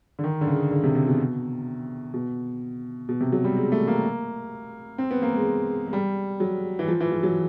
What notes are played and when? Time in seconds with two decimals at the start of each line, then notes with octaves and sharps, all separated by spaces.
0.19 D3
0.24 D#3
0.41 D3
0.47 C#3
0.71 D3
0.83 C3
0.95 C3
1.07 B2
2.14 B2
3.09 B2
3.20 C3
3.32 F#3
3.44 G3
3.56 G#3
3.72 A3
3.87 A#3
4.98 C4
5.11 B3
5.22 A#3
5.34 G#3
5.87 G#3
5.93 G3
6.40 F#3
6.79 E3
6.88 F3
7.00 E3
7.12 F3
7.23 F#3